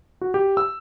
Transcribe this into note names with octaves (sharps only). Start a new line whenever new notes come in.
F#4
G4
E6